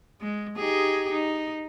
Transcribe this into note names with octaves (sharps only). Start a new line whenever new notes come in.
G#3
D#4 G4 G#4
D#4